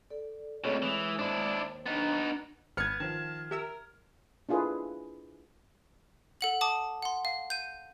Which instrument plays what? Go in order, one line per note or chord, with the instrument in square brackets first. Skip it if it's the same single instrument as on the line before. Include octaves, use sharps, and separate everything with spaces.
[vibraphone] A4 D5
[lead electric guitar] C#2 B2 [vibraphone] A3 C4 D5 [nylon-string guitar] G#4 A4 C#5
[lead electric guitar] E3 [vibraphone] G#3 D#6
[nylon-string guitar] D#2 B2 C5 [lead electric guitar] D4 E4
[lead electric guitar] B3 D#4 [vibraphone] D4 A#5
[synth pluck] G#1 B4 C#7 [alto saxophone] B3 [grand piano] F6 G#6
[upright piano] D#3 F3 [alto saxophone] A5
[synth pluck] G4 E5 E6 [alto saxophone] A#4
[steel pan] D4 E4 F4 G#4 A4 B4
[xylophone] A4 F#5 F#7
A5 D6 D#6
F#5 C6
F5
G6 D#7